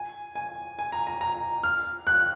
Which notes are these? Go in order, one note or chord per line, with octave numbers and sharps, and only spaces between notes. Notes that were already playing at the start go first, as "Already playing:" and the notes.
Already playing: G#5
G#5
G#5
A#5
A#5
A#5
F6
F#6